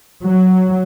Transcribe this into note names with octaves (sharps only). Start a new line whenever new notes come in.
F#3